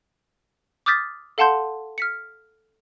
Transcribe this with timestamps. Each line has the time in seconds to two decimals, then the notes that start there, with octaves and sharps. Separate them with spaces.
0.86 D6 D#6 F6 G6 A6 B6
1.38 A4 F5 F#5 A5 C6 G6
1.98 F6 B6 C#7